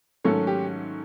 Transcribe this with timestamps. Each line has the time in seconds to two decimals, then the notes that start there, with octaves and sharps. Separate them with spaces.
0.24 G#2 D#3 F#3 A3 C#4 A4
0.47 G4